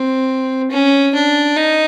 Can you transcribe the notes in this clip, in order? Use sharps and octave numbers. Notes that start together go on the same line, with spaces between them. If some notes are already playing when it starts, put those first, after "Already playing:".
Already playing: C4
C#4
D4
D#4